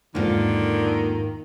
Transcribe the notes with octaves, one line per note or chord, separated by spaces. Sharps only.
E2 G#2 D3 D#3 A#3 F4